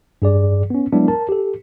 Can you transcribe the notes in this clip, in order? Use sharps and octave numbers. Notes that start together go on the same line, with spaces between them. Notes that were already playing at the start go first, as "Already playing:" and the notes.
G2 G#4 D5
B3 C#4
F#3 G#3 B3 D4 E4
A#4 A5
G4 A4